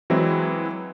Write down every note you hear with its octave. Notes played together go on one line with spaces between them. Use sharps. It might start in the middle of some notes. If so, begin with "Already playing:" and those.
E3 F#3 G#3 C4 E4